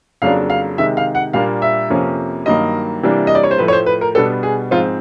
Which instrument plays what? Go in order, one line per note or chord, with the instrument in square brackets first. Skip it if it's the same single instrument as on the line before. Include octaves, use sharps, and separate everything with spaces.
[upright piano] F2 C#3 F#3 A#3 D4 F5
F5
C3 D#3 G#3 E5
F5
F#5
A#2 G3 A#3 D4 F5
E5
F2 C3 F3 A#3 C#4
G2 D#3 F#3 A#3 D#5
C3 E3 G3 A#3 D4
D#5
D5
C#5
C5
A2 F3 A3 B4
C#5
C5
B4
A#4
B2 G3 B3 D4 A4
G#4
G#2 F3 G#3 C4 F4